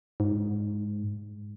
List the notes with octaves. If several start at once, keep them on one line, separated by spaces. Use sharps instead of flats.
G#2